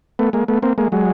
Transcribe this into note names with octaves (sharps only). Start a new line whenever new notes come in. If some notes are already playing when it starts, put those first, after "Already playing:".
A3 B3
G#3 A#3
A3 B3
A#3 C4
G#3 A#3
F#3 G#3